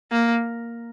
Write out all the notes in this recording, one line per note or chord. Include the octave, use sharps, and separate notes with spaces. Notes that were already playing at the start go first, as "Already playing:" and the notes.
A#3